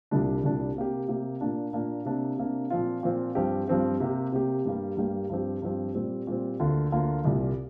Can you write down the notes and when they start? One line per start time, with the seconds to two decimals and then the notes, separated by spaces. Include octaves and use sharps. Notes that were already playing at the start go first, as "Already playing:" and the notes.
0.11 C2 A#2 G3 D4
0.43 C2 A#2 G3 D4
0.76 C3 A#3 G4
1.08 C3 A#3 G4
1.41 A#2 A#3 D4
1.73 A#2 A#3 D4
2.05 C3 A#3 D4
2.38 C3 A#3 D4
2.70 A#2 F3 C4 F4
3.03 A#2 F3 C4 F4
3.35 G2 F3 C4 G4
3.68 G2 F3 C4 G4
4.00 C3 A#3 G4
4.32 C3 A#3 G4
4.65 G2 G3 A#3 G4
4.97 G2 G3 A#3 G4
5.30 G2 F3 C4 G4
5.62 G2 F3 C4 G4
5.95 A#2 G3 C4
6.27 A#2 G3 C4
6.60 D2 D3 A#3 F4
6.92 D2 D3 A#3 F4
7.24 C2 A#2 G3